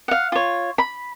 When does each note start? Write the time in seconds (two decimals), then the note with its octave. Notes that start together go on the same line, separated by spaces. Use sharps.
0.08 F5 F#5
0.32 F4 C#5
0.78 B5